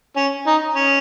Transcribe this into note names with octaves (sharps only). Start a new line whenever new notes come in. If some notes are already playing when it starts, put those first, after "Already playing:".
C#4
D#4
C#4